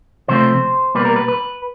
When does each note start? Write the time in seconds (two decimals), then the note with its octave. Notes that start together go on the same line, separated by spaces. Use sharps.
0.28 C3 F3 A3 C4 C5
0.95 B2 G3 A#3 B4
1.05 A#4
1.16 B4
1.28 B4